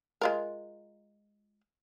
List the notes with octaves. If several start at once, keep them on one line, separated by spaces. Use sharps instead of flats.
G#3 F4 A#4